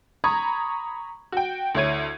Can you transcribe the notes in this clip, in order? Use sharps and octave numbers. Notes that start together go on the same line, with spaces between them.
A#5 B5 C#6 D#6 G#6
F#4 G5
D2 E4 C#5 G#6 D#7